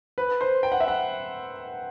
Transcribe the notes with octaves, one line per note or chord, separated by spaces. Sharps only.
B4
C5
G5
F#5
E5
F#5